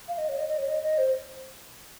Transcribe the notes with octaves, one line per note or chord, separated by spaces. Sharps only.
F5
D#5
C#5
D#5
D#5
C#5
D#5
D#5
C5